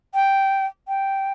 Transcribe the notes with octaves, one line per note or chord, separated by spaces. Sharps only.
G5
G5